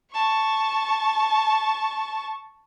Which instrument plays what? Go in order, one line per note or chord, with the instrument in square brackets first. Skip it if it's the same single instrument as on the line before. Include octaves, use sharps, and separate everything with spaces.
[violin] A5 C#6